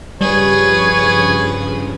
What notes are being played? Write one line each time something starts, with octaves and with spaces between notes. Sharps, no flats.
G2 C#3 F3 G3 G#4 B4 C#5